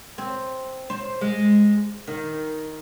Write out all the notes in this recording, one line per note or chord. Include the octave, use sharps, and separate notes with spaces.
C4
C5
G#3
D#3